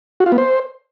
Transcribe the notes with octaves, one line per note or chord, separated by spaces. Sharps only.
F#4
F4
B3
C5